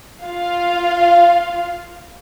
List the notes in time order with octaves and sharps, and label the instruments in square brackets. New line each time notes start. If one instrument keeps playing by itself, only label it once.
[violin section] F4 F5